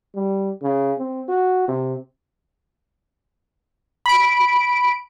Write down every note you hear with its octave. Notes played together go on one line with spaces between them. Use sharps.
G3
C#3
C4
F#4
C3
B5 D7